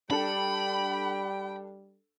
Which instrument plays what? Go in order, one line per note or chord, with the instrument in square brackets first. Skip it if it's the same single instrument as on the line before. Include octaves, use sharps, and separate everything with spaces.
[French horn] G3 [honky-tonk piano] D4 A4 [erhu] G5 [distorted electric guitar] B5